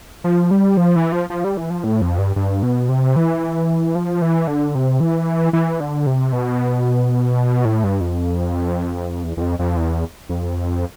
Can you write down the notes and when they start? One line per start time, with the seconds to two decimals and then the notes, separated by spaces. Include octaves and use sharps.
0.24 F3
0.51 G3
0.77 F3
0.96 E3
1.12 F3
1.30 F3
1.44 G3
1.57 E3
1.70 F3
1.84 A2
2.01 F2
2.18 G2
2.36 G2
2.63 B2
2.89 C3
3.16 E3
3.95 F3
4.22 E3
4.47 D3
4.75 C3
5.00 E3
5.53 E3
5.80 D3
6.07 C3
6.33 B2
7.65 A2
7.84 G2
8.01 F2
9.24 E2
9.37 E2
9.41 F2
9.59 F2
9.77 E2
10.29 F2